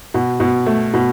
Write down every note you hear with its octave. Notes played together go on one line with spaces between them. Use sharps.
B2
B2
A3
B2